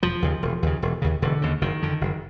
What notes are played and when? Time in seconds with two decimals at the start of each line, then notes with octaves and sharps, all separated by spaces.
0.02 E1 F3
0.22 D#2 C#3
0.42 E1
0.63 D#2 C#3
0.82 E1
1.02 D#2 C#3
1.22 E1 D3
1.42 D#2 C#3
1.61 F#1 D#3
1.82 F2 D3
2.01 F#1